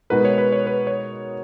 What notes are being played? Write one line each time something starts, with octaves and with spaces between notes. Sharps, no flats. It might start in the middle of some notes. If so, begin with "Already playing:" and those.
B2 G#3 D#4 F#4 A#4 B4
C#5
B4
C#5
B4
C#5